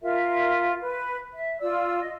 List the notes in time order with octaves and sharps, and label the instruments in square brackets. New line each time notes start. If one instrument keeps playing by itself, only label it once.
[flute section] F4 A#4 E5
B4
E5
F4 D5 E6
D#5